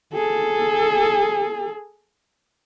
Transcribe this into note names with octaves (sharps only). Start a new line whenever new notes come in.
G#4 A4